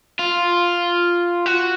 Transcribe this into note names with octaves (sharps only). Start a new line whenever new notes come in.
F4
F#4